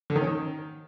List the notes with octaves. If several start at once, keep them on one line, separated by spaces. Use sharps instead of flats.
D3
D#3
C#4
D#3